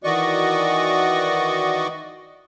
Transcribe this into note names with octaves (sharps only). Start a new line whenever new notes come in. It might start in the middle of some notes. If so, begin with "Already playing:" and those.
D#3 E3 F#4 D5 D#5 C#6